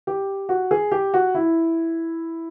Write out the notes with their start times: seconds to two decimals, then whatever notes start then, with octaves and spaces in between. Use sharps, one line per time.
0.07 G4
0.49 F#4
0.71 G#4
0.92 G4
1.14 F#4
1.35 E4